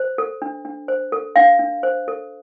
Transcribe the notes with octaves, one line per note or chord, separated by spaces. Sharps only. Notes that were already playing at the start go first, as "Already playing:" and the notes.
Already playing: C5
A4
D4
D4
C5
A4
D4 F5
D4
C5
A4